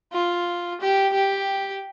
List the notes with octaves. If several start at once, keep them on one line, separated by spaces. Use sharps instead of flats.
F4
G4
G4